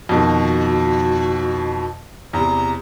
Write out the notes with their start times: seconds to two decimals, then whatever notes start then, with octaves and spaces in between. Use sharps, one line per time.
0.09 F2 B2 D#3 F#4
2.33 E2 C3 A#5